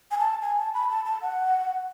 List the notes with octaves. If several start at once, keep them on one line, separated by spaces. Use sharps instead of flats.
G#5
A5
G#5
A5
B5
A5
A5
F#5